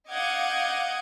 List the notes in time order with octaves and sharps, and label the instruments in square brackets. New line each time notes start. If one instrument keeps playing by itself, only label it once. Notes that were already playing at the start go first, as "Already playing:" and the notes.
[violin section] D#5 F5 F#5 D6 G6 G#6